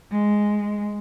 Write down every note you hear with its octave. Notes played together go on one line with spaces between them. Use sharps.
G#3